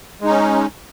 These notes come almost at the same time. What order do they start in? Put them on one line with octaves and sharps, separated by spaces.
G#3 D#4 C#4